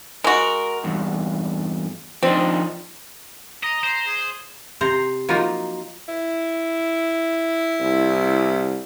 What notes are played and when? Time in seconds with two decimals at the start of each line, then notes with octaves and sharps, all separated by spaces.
0.24 G#3 F#4 A#4
0.84 E2 G2
2.23 F3 C4 D4 D#4
3.64 D#5 A#5
3.83 C5
4.07 G#4
4.81 C3 C5 A#5
5.29 F3 F#3 A#3 D#4 F4
6.08 E4
7.80 C2